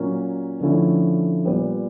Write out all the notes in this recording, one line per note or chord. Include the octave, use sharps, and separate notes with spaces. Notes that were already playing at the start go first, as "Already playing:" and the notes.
Already playing: A#2 F#3 A#3 C#4
D3 F3 A3 C#4 E4
A#2 G3 B3